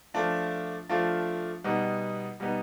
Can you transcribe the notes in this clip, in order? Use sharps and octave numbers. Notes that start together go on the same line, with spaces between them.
F3 A3 D4 F4
F3 A3 D4 F4
B2 G3 B3 D#4
B2 G3 B3 D#4